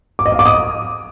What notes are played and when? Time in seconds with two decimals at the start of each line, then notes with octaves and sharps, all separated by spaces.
0.19 D6
0.26 D#5
0.32 F5
0.39 D6
0.46 D#6